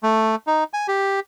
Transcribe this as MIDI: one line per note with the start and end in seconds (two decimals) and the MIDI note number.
0.03 0.35 57
0.47 0.64 63
0.73 0.87 80
0.88 1.20 67